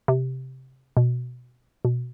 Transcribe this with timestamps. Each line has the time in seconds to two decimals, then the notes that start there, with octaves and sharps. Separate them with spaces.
0.08 C3
0.97 B2
1.85 B2